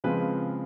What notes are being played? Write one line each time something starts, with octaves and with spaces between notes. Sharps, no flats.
C#3 F3 G#3 C4 B4